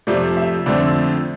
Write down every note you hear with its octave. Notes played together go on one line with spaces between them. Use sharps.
F2 C3 F3 A3 D5
E5
F2 D3 A3 C4 D5